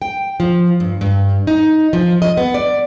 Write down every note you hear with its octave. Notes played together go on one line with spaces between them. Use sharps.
G5
F3
G2
G2
D#4
F3
D#5
B3
D5